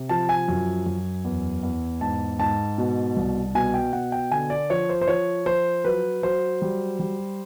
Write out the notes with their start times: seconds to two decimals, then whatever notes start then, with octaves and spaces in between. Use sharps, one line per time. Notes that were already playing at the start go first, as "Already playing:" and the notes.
Already playing: C3
0.09 F3 A5
0.29 G#5
0.48 F#2
0.86 F#2
1.25 E2
1.63 E2
2.01 G#2 A5
2.39 G#2 A5
2.78 B2
3.17 C2
3.55 B2 G#5
3.74 G5
3.93 B2 F#5
4.12 G5
4.31 D3 G#5
4.50 D5
4.70 F3 C#5
4.89 C5
5.01 C5
5.08 F3 C#5
5.46 F3 C5
5.84 F#3 B4
6.23 F#3 C5
6.62 G3
7.00 G3